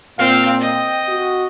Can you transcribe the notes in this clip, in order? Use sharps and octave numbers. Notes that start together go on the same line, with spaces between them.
A#2 C4 F5
D#5 G5
F#4